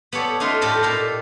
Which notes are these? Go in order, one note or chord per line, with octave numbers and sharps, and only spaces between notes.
B3 G4 A4 C#5 D5
A3 D4 D#4 F4 C6
A2 F4 G4 A4 D#5
A#2 A4 G5 A#5 C6